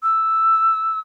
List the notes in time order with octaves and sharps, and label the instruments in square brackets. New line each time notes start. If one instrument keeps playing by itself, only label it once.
[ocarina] E6